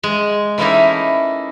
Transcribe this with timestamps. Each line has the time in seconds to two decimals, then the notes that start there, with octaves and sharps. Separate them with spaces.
0.03 G#3
0.58 E3 A3 A#3 C#4 D#4 E4